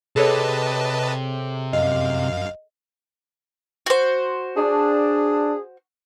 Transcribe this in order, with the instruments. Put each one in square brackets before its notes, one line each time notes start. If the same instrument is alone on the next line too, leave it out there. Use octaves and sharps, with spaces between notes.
[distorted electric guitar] C3 [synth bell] G#4 A4 C#5 [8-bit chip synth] B4 D#5 A5
[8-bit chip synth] F#2 F5 [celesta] D#5
[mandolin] F#4 C5
[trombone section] D4 [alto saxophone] G#4